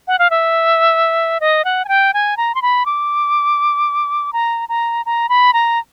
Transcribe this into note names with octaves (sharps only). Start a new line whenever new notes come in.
F#5
F5
E5
D#5
F#5
G#5
G5
G#5
A#5
C6
B5
D6
A#5
A#5
A#5
B5
A#5